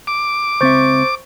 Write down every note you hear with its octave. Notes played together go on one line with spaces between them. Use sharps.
D6
C#2 C4 C5 E5 C#6 A6